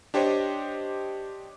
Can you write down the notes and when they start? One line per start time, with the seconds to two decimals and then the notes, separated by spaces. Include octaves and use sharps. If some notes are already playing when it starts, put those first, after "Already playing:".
0.14 D4 G4 C5 C#5 D#5